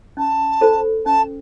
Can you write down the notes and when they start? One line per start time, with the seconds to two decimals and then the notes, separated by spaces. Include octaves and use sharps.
0.17 C#4 A5
0.61 F4 A4 C5
1.06 C#4 A5